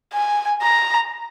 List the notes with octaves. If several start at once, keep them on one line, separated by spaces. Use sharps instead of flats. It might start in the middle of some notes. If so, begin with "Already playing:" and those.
G#5
A#5